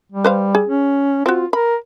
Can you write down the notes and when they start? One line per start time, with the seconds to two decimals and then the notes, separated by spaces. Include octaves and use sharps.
0.12 G3
0.24 B4 C5 F5
0.55 G#4
0.68 C#4
1.26 C4 F4 F#4
1.53 A#4 B5